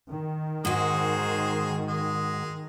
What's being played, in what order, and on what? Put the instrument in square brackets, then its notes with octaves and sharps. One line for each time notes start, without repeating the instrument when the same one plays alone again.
[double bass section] D#3
[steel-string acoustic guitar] G#2 F#4 [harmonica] G#3 G#4 C5
[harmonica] G#3